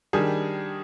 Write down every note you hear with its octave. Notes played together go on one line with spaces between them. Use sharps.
D#3 G3 D4 G#4